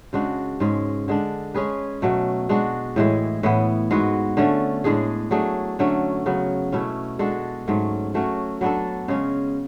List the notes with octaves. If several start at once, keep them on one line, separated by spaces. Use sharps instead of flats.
C#3 G#3 D4 F#4
G#2 G#3 C#4
D3 G#3 D4
G#3 C#4 G#4 B4
B2 F#3 A3
G#3 D4 F#4
A2 E3 G#3
A2 E3 B3
G#2 G#3 B3 F#4
D3 A3 C#4
A2 G#3 D4 G#4
F#3 A3 D4 G#4
D3 F#3 A3 C#4
C#3 F#3 B3
B2 A3 C#4 E4
G#3 D4 F#4 A4
G#2 F#3 A3 C#4
F#3 A3 C#4 F#4
F#3 B3 D4 A4
C#3 G#3 C#4